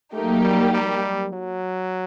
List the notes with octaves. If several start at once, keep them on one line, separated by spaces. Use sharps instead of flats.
F#3 A3 A#3 D#4 G4
G3
G3
F#3